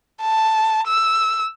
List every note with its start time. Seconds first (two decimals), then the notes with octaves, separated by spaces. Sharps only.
0.21 A5
0.87 E6